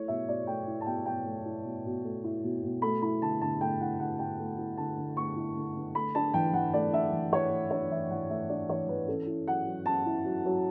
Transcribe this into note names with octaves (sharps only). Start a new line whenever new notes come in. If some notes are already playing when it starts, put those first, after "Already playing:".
Already playing: A3 E4 C#5
B2 E5
B2 D5
A3 G5
E4
A5
B2 G5
B2 G5
A3
E4
B2
B2
A3
E4
B2
B2
A3 B5
E4 B5
D3 A5
D3 A5
A3 G5
E4 F#5
D3 F#5
D3 G5
A3
E4
D3 A5
D3
A3 C#6
E4
D3
D3
A3 B5
D4 A5
E3 G5
E3 F#5
A3 D5
D4 E5
E3
E3 C#5
A3
D4 C#5
E3 E5
E3 F#5
A3 E5
D4 D5
E3 C#5
E3 B4
C#4 A4
E4
F#3 F#5
F#3
C#4 A5
E4
F#3
F#3